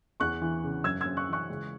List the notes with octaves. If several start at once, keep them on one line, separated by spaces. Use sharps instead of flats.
E2 C#6 F#6
E3
C#3
F#2 E6 G#6
E6 G#6
F#2
C#6 F#6
E3 C#6 F#6
C#2